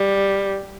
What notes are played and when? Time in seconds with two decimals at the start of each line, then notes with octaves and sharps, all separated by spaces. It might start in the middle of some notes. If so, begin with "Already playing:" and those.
Already playing: G3